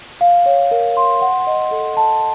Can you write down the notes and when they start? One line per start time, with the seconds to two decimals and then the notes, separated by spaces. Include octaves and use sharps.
0.21 F5
0.46 C#5
0.71 A#4
0.97 C6
1.21 F#5
1.47 D#5
1.71 A4
1.97 A5